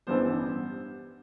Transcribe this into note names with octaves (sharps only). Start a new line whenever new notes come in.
A1 G2 E3 G3 B3 C5